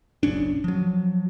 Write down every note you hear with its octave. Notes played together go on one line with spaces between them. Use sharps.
F#1 B1 C#4 D4
F3 F#3